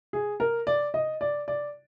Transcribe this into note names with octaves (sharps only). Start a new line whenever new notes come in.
G#4
A#4
D5
D#5
D5
D5